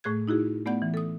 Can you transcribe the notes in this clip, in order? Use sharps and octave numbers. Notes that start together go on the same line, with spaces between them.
A2 A3 G#4 F#6 G#6
D#4 E4 F#4 G#4
A3 B3 D5 F#5 G6
E3
A4 D#6